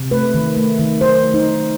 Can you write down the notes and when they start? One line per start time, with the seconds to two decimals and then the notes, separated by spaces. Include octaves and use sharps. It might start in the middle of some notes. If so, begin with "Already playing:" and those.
Already playing: C3
0.11 A3 B4
0.34 D#3
0.57 A3
0.79 D#3
1.01 F#3 C5
1.24 A3
1.34 D#4
1.46 D#3